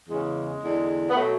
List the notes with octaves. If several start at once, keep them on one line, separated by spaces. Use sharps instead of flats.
E2 C#3 E3 G#3
E2 D3
B3
B2 F#3 A3